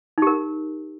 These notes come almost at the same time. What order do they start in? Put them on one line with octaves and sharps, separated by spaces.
D#4 G4 A#4